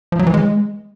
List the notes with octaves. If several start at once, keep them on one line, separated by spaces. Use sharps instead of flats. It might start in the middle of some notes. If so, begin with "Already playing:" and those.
F3
F#3
E3
G#3